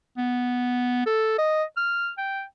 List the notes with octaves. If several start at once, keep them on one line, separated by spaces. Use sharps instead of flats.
B3
A4
D#5
F6
G5